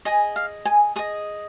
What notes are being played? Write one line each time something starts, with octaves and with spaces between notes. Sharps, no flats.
G#4 D#5 G#5
F5
G#5
G#4 D#5 D#6